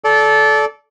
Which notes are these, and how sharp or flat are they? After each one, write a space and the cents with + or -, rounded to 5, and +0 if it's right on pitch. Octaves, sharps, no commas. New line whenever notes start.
A4 -20 D5 -20